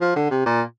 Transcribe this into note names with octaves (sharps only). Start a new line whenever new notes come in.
F3
D3
C3
A#2